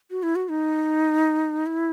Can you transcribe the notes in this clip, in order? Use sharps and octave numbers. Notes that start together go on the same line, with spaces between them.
F#4
E4
F#4
D#4
E4